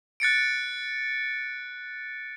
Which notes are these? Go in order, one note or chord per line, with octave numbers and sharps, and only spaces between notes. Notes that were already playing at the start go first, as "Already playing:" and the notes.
F#6 A6 C#7 D7